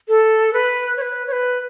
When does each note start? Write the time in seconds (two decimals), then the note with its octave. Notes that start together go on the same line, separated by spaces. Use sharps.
0.08 A4
0.53 B4
0.97 C#5
1.02 B4
1.27 C#5
1.32 B4